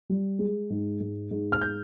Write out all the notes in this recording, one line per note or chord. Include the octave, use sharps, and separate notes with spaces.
G3
G#3
G#2
G#2
G#2
F6
G6